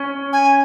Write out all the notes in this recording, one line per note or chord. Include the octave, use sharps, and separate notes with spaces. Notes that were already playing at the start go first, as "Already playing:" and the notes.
Already playing: C#4
G#5